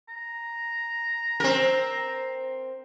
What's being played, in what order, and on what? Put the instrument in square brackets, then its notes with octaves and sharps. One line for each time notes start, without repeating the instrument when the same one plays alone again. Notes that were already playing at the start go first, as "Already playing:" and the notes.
[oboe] A#5
[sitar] C4 A#4